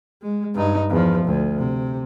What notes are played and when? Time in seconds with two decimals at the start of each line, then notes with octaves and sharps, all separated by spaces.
0.22 G#3
0.55 G2 D#4
0.90 E2 F3
1.26 D2
1.58 C3